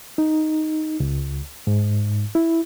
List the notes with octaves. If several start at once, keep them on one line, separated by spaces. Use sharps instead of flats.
D#4
C#2
G#2
E4